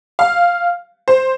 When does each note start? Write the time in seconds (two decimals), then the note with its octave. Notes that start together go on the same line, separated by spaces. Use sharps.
0.19 F5
1.08 C5